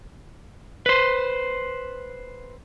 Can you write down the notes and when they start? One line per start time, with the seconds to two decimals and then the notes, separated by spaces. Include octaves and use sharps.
0.86 B4 C5